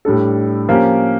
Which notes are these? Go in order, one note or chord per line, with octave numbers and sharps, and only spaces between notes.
A2 G3 D4 A4
F3 A#3 C#4 G4 A#4